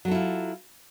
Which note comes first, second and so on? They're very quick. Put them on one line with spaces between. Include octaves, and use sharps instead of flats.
F#3 A4 E4 F4